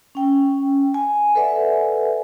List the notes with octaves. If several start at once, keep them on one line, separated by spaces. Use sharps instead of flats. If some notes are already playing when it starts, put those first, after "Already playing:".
C#4 G5
G#5
A4 B4 D5 E5 F#5 G#5